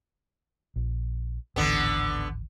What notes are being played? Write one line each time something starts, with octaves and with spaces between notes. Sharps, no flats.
A#1
D1 G#1 D3 E3 B3